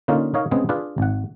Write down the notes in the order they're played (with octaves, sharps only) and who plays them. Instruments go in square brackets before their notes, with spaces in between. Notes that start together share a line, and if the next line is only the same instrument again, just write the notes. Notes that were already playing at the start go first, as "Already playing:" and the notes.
[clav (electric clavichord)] D3 A#3 C#4 D#4 F4
D#4 A#4 C#5 D#5 F5
C#3 G#3 B3 C4 G#4
D4 F4 G#4 B4
G#1 F#5